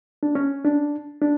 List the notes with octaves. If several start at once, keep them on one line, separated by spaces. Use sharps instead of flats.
D4
C#4
D4
D4